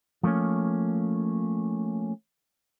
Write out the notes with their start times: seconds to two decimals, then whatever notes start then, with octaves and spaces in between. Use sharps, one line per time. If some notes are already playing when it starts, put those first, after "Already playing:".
0.23 F3 A3 A#3 C#4